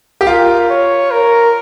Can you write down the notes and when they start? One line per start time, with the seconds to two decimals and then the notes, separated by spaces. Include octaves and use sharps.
0.21 G4
0.27 F4 A#4
0.70 C#5
1.11 A#4